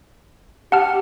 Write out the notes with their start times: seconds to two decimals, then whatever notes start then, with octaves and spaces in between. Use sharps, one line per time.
0.72 G4 F#5 A5 F6